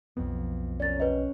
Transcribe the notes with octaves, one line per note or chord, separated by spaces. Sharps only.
B1 F2 B3
C#4 A#4 D5 A6
A#4 B4 D#5 F#5 G5